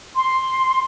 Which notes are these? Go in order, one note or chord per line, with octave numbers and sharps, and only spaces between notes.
C6